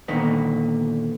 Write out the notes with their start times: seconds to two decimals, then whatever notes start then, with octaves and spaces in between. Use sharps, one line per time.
0.08 A#2 D3 D#3 B3